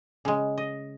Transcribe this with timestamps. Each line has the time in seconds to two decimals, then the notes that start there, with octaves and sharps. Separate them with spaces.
0.25 C#3 G#3
0.58 D#5